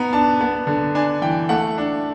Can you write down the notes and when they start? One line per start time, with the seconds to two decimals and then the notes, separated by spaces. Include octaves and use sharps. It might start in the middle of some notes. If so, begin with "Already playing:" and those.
Already playing: B3 D#4 A#5
0.13 D4 A5
0.41 B3
0.67 D3
0.95 D4 G#5
1.22 E3 G5
1.49 A3 F#5
1.78 D4